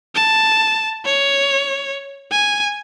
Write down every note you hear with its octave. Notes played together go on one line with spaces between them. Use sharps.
A5
C#5
G#5